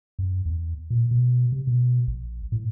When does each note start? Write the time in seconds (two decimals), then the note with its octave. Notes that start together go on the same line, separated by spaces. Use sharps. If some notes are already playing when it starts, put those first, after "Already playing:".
0.19 F#2
0.46 E2
0.90 A#2
1.11 B2
1.52 C3
1.67 B2
2.08 A#1
2.52 A2